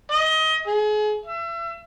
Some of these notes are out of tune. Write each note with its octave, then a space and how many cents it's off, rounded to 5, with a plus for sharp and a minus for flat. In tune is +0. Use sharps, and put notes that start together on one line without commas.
D#5 +25
G#4 +35
E5 +35